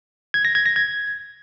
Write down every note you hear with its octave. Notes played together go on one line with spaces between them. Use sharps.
G#6
A#6
G#6
A#6
G#6